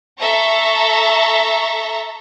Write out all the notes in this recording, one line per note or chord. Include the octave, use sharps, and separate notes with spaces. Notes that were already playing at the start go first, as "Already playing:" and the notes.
A4 E5 A5 A#5 C#6